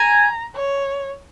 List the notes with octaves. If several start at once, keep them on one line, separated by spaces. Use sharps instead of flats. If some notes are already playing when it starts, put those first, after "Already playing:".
Already playing: G#5 A#5
C#5